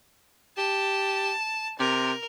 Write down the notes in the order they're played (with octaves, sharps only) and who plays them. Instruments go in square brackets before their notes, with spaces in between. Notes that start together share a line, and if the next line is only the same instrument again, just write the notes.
[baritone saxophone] G4 [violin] A5
[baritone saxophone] C3 [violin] A#4